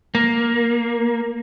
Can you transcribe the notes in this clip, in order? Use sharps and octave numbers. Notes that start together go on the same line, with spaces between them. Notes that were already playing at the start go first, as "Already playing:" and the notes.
A#3